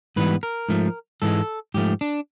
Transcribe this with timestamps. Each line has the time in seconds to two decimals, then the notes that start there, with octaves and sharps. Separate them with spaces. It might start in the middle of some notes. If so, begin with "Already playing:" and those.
0.16 G#2 E3 G3 B3 B4
0.43 A#4
0.69 G#2 F3 A3
1.22 G#2 E3 G#3 A4
1.74 G#2 F3 A3 G4
2.01 D4